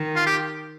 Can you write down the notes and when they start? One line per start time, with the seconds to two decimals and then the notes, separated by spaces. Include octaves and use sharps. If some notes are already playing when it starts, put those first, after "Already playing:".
Already playing: D#3
0.16 F4
0.26 G4